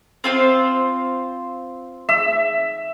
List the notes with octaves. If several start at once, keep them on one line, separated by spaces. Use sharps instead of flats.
C4 F4 C5
E5